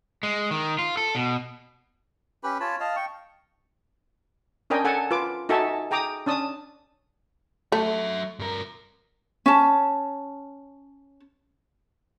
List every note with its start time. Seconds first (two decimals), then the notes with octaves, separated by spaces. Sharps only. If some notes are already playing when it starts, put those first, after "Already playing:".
0.23 G#3
0.51 D#3
0.78 F4
0.97 A4
1.15 B2
2.44 C#4 G4 B4 B5
2.60 F4 C#5 A5 B5
2.80 D#5 F5 A5
2.96 G5 C#6
4.70 C#4 D4 A#4 D#5 G5 G#5
4.84 A4 F#5 G#5 A5
5.11 F4 B4 D6
5.49 D#4 F#4 A4 E5 G#5 A5
5.91 G#4 G5 A#5 D6 D#6
6.26 C#4 D4 A5 D#6
7.72 F#3 A3 E5
8.39 G2 A#4
9.46 C#4 A5